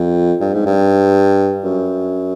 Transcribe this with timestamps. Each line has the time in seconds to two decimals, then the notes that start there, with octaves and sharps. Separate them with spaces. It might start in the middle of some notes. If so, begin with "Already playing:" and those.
Already playing: F2
0.41 G2
0.53 G#2
0.66 G2
1.64 F#2